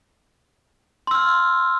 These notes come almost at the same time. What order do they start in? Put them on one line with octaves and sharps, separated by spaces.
C6 E6 F6